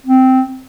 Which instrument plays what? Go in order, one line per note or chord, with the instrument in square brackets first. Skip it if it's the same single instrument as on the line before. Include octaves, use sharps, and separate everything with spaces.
[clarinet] C4